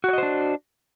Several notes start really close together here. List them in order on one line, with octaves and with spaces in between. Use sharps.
F#4 C#5 D#5 C5 D4